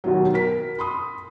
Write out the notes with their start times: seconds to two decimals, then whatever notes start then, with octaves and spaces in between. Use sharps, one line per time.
0.04 D#2 B2 F#3
0.34 A#4 B6
0.78 B5 C6 D#6